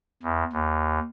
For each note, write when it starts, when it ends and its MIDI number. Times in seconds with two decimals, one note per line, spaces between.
0.23 0.44 40
0.53 0.99 39